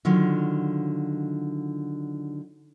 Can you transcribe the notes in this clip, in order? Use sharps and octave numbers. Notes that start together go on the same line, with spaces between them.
D3 D#3 F#3 F4